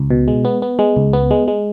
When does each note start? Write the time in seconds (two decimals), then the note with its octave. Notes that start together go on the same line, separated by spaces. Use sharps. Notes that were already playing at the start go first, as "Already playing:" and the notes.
Already playing: C#2
0.10 B2
0.28 G#3
0.45 B3
0.62 B3
0.79 G#3
0.96 C#2
1.13 B3
1.31 G#3
1.48 G#3